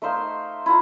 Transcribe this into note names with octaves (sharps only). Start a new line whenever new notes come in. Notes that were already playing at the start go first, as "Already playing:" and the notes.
A3 D#4 C5 F5
E4 F4 A#5